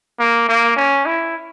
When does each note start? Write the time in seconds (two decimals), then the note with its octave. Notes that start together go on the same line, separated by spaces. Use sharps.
0.20 A#3
0.49 A#3
0.76 C#4
1.06 E4